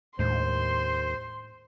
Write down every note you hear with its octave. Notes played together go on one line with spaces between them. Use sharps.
D#2 A2 G#3 D4 C5 C6